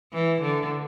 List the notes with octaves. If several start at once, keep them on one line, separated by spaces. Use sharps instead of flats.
E3
D3